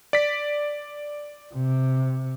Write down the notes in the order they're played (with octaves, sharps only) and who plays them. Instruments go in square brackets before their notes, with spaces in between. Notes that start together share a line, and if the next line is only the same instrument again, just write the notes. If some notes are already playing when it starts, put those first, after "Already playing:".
[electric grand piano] D5 B6
[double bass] C3